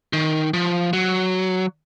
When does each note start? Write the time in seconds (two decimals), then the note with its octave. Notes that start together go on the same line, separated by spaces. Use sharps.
0.13 D#3
0.54 F3
0.93 F#3